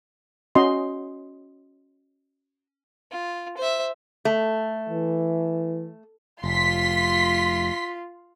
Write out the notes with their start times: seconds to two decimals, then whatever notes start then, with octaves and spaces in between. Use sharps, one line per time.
0.55 C#4 F#4 D#5 C6
3.11 F4
3.58 C5 E5
4.25 A3
4.89 E3
6.44 F1 F4 C6 B6